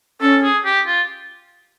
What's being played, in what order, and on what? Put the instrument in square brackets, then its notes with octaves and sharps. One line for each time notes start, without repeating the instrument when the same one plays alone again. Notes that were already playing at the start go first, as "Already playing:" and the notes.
[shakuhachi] C#4 [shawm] A4
[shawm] G#4
G4
F4